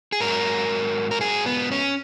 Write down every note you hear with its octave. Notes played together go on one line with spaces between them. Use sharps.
G#4
G#2 F#3 A#4
A#4
G#4
B3
C#4